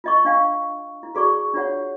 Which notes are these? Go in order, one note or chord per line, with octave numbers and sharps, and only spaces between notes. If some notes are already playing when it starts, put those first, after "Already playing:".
F4 D#5 C#6
D4 F5 G5 C#6
E4
F#4 G#4 D5 C#6
D4 F4 C#5 F#5